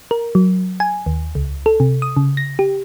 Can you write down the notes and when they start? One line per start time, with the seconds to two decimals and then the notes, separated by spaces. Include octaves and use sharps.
0.11 A#4
0.35 F#3
0.80 G#5
1.06 D#2
1.35 C#2
1.66 A4
1.80 C3
2.02 D#6
2.17 C#3
2.37 A#6
2.59 G4